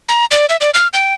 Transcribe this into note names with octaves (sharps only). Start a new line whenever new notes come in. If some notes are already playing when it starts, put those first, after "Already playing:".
A#5
D5
E5
D5
F6
G5